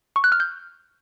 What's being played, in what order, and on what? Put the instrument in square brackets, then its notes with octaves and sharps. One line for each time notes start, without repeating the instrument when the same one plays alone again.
[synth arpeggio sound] C#6
F#6
F6
G6